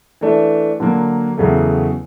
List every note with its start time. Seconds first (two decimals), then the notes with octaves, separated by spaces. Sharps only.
0.21 E3 A3 D4
0.80 D3 F#3 A#3
1.38 E2 C#3 F#3 A3